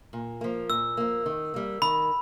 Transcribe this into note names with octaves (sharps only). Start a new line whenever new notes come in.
A#2
F3 A#3
A#2 E6
F3 A#3
D#3
G3 A#3
D#3 B5